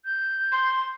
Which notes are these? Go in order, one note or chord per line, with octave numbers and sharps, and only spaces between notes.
G6
C6